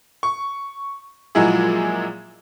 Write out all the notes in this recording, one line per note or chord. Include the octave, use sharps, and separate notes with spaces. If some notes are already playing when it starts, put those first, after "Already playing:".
C#6
A#2 F3 F#3 G#3 E4 G#4